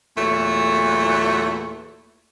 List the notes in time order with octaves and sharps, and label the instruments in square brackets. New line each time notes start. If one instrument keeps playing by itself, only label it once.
[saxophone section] E2 A#2 F#3 A3